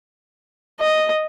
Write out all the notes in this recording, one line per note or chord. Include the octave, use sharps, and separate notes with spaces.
D#5